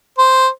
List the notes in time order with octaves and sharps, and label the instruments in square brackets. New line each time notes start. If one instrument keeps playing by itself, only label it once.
[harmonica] C5